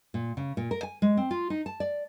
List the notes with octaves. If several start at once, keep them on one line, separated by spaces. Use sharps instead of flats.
A#2
C#3
A#2
A#4
G#5
G#3
C4
F4
D#4
A5
D5